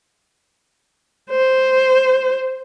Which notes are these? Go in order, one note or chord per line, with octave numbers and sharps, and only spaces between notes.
C5